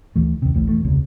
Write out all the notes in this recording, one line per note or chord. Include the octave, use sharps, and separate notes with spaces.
D2 E3 A3
D#2 C3
A1 D2 A2
E1 E3 A3
E1 C#2 C3